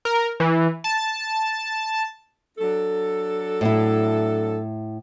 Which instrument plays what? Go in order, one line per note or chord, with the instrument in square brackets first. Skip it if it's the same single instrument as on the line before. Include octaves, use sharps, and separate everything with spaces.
[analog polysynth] A#4
E3
A5
[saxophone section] F#3 D4 A4
[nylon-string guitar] A2 E4